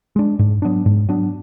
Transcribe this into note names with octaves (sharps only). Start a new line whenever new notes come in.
G#3 D4
G#2
F#3 B3 D4
G#2
F#3 B3 D4